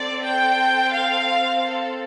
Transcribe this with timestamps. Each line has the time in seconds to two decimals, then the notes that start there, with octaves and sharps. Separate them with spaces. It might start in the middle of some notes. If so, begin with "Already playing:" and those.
Already playing: C4 A4 D5
0.24 G5
0.92 F5
1.62 A4